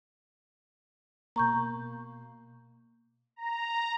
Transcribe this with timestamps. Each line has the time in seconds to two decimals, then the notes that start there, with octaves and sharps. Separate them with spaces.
1.36 B2 A#3 A#5 C#6 G6
3.36 A#5